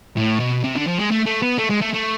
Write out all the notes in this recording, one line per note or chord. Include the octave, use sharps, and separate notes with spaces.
A2
B2
C3
D3
F3
G#3
A3
A3
B3
A3
G#3
A3
A3